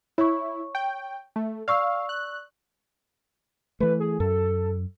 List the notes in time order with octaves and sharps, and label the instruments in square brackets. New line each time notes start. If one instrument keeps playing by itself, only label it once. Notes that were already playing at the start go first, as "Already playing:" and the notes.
[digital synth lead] E4 [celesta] C#5 C#6
[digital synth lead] G5
A3
[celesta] D5 C#6 E6 [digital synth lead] F5
[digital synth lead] F#6
[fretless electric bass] E3 A3 [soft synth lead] B4
[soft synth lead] G#4
[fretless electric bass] F#2 [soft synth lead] A4